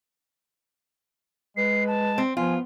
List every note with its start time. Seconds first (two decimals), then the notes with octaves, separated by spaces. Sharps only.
1.57 G#3 B4 C7
1.87 A5
2.18 C4
2.37 F3 B3 F4 G#5